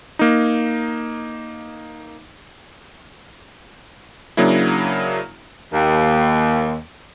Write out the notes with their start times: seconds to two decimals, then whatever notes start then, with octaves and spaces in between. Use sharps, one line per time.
0.19 A#3 D#4
4.37 C#3 F#3 A#3 D4 E4
5.72 D#2